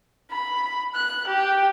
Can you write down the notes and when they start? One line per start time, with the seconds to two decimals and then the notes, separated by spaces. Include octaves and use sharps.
0.30 B5
0.95 F#6
1.27 G4